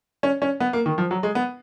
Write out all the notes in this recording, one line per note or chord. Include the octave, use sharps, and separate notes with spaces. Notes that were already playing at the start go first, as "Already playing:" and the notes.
C#4
C#4
B3
A#3
D#3
F3
F#3
G#3
B3